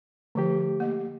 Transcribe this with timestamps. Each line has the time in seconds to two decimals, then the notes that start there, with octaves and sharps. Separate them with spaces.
0.35 D3 F3 A3 G4
0.80 A#3 D#5